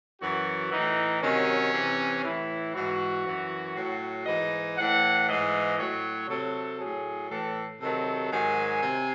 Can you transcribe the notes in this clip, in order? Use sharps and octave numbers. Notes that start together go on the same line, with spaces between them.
F#2 E3 F#4
A2 E3 D#4
C3 D#3 F#3 C#4
C3 E3
A2 E3 E4
G#2 E3 F#4
F#2 E3
A2 F#3
G#2 E3 D#5
A2 E3 F#5
G#2 E3 D#5
A2 F#3 C#5
C3 F#3 A4
A2 F#3 G#4
A2 E3 A4
C3 D#3 F#3 A4
G#2 D#3 F#3 G#5
C3